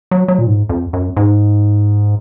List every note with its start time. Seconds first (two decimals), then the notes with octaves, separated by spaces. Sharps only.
0.11 F#3
0.28 F#3
0.39 A#2
0.46 G#2
0.69 F2
0.93 F#2
1.17 G#2